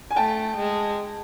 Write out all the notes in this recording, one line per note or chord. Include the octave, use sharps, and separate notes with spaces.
G#5
A3 G5 A5
G#3